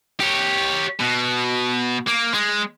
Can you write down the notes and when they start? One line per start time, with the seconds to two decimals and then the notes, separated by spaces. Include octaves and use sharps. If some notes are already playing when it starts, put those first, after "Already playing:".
0.20 G4 C#5
1.00 B2
2.07 A#3
2.34 G#3